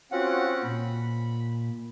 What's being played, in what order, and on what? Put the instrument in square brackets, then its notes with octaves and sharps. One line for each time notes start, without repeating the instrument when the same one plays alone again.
[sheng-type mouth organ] C4 C#4 F#5 [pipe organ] F4 F#4
[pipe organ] A#2 [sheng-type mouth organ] B5